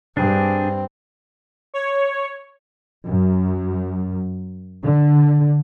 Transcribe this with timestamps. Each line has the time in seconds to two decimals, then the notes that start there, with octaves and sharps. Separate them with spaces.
0.17 G2 C4 D4 G#4
1.74 C#5
3.07 F#2
4.82 D3